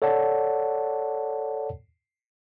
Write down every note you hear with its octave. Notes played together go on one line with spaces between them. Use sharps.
A4 C#5 D5 F#5 A5